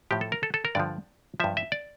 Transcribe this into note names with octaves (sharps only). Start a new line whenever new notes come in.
A2 F3 G4
A4
A#4
A4
A4
A#4
G2 D3 F3 D5
G2 F3 E5
E5
D5